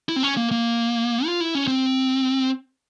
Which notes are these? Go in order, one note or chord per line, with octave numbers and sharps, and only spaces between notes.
E4
C4
C#4
A#3
A#3
F4
E4
C#4
C4